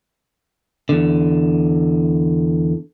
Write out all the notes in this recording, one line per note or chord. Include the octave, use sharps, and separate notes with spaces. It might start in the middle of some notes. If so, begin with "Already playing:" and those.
E2 D3